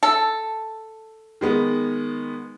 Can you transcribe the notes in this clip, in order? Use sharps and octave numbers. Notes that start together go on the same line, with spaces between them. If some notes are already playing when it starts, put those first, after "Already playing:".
A4
D#3 G#3 B3